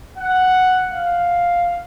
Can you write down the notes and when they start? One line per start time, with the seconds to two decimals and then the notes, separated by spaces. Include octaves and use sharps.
0.18 F#5
0.91 F5